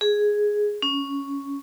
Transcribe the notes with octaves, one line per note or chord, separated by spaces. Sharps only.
G#4
C#4